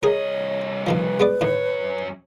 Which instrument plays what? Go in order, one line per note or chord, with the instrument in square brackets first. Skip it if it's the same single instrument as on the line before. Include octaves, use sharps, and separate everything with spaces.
[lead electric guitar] C2 D#5 [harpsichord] G#4 A#4 [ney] C#5
[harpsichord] B2 D#3 F3 [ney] B4
[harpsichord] G#3 B3 D5
[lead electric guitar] F#2 C#5 [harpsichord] A2 D#3